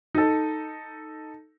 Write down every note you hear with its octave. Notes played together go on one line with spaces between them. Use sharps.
D#4 A4